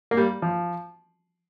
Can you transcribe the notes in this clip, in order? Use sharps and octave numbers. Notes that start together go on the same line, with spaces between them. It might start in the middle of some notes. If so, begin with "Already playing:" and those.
A#3
G3
F3